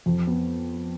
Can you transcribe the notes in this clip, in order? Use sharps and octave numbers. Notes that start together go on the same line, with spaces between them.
F2
B3